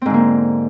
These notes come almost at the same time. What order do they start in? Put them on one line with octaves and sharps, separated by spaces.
C4 G#2 D3 A#3